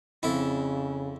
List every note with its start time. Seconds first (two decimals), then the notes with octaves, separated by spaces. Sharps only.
0.23 F2 C#3 E4